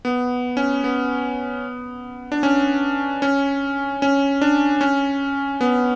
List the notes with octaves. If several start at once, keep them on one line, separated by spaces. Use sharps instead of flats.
B3
C#4
B3
D4
C#4
C#4
C#4
D4
C#4
B3